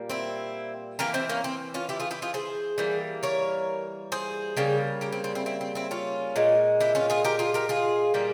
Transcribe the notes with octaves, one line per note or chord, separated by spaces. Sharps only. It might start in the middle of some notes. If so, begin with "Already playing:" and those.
Already playing: A#2 G3 A#3
C4 E4
E3 A#3 G4 A#4
C4 E4
A#3 C#4
C4
C#4 F4
E4 G4
F4 G#4
E4 G4
F4 G#4
G#4 C5
E3 G3 A#3
A#4 C#5
G#4 C5
C#3 G3 A#3
G4 A#4
C4
C4
C4 E4
C4 E4
C4
C4 E4
C#4 F4
A#2 G#3
E4 G4
C#4 F4
F4 G#4
G4 A#4
F4 G#4
G4 A#4
F4 G#4
A#2 G3 A#3